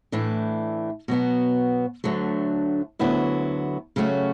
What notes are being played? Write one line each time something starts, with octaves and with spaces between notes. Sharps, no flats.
A2 E3 A3 D4
B2 F#3 B3 F#4
D2 D3 F#3 A3 D4
D2 D3 F#3 B3 E4
C#3 F#3 A3 C#4 F#4